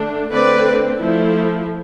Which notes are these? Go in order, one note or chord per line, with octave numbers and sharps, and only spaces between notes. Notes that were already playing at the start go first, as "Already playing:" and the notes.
Already playing: D3 A3 D4
D3 A3 C4 B4 D5
F3 A3 E4